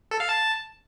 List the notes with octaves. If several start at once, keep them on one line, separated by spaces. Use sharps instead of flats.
A4
F5
A5